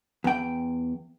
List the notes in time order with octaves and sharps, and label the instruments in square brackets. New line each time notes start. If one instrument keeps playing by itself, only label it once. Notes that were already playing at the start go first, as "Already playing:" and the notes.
[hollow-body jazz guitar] E2 G5